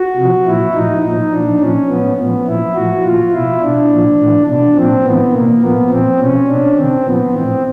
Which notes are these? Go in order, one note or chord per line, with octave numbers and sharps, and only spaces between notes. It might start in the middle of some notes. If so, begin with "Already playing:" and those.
Already playing: F#4
C3 F3
A#2 F3 E4
A2 F3 D#4
A#2 F3 D#4
A#2 F3 D4
A#2 F3 C#4
A2 F3 B3
A2 F3 B3
A#2 F3 E4
A2 F3 F#4
A#2 F3 F4
B2 E4
B2 D4
A#2 F3
A2 E3
B2 D4
A#2 F3 C4
A2 E3 B3
B2 A#3
A#2 F3 B3
A#2 F3 C4
B2 C#4
B2 D4
C3 D#3 C4
A#2 F3 B3
A2 E3 C4